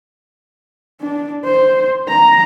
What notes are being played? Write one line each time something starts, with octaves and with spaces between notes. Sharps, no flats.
D4
C5
A#5